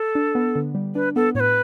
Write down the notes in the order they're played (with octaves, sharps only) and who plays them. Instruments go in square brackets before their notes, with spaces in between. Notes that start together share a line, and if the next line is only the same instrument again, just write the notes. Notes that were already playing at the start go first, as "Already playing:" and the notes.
Already playing: [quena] A4
[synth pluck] D4
B3
D3
G3
[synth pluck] D4 [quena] B4
[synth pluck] B3 [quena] A4
[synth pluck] A2 [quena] C#5
[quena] B4